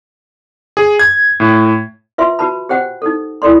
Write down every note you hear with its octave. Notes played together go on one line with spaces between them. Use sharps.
G#4
G#6
A2
F4 B4 E5 C6
F#4 B4 A5 B5
G4 C5 F#5 G5
D#4 A4
E4 A4 D5 C6